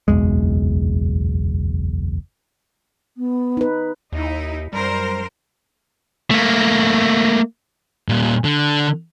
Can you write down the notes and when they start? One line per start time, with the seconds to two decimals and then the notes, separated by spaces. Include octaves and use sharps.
0.08 F#1 B1 E2 G#3
3.17 B3
3.57 D#4 B4
4.13 D#2 D#4 E4
4.73 F#2 G3 A#4 C5
6.31 A3 A#3
8.09 A#2 G3
8.44 D3